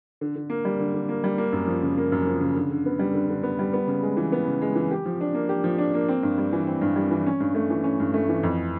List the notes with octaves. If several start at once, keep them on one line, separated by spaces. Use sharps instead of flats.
D3
D3
A#3
G3
D3
D3
A#3
G3
A#3
F#2
F3
C#3
A#3
F#2
F3
C#3
D3
D3
B3
G3
D3
D3
B3
G3
B3
C#3
G#3
E3
B3
C#3
G#3
E3
G4
F3
D4
A#3
G4
F3
D4
A#3
C4
G2
G3
E3
C4
G2
G3
E3
C#4
G2
A3
E3
C#4
G2
A3
E3
F2